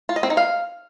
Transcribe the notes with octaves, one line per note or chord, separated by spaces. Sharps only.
F4
D#5
C4
D#4
F5